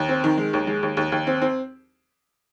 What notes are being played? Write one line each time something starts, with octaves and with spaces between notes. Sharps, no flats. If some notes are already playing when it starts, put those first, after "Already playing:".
Already playing: D#2
C4
D#3
G#3
D#2
G#3
D#2
D#2
D#2
C4
C4